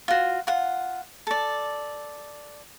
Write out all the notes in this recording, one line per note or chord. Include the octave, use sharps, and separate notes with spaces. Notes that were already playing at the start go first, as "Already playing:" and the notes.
F4 F#4
F4 F#5
A4 D5